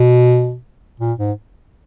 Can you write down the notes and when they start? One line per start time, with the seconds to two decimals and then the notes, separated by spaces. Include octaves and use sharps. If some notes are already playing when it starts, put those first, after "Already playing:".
Already playing: B2
1.00 A#2
1.19 G#2